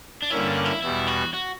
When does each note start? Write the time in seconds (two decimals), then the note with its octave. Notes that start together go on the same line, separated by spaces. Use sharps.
0.22 D4
0.30 G2 D3 A#3 C#4 E4
0.48 D4
0.65 E4
0.82 E2 B2 G3 E4
1.07 F#4
1.34 F#4